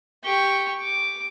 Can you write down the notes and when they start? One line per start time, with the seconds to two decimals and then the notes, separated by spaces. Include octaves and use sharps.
0.24 G4 C#6
0.82 D6